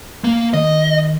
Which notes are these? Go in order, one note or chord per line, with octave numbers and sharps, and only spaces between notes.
A#3
D#3 D#5